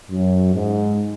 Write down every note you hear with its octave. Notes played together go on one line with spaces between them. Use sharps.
F#2
G#2